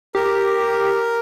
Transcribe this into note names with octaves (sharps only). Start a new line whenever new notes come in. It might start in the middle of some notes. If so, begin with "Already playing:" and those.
G4 A#4